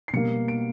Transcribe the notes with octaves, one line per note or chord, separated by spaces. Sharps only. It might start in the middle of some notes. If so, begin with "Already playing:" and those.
C7
B2 G3 A#3 C#7
D7